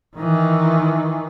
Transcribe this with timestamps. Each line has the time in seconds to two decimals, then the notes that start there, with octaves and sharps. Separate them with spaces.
0.17 D#3 E3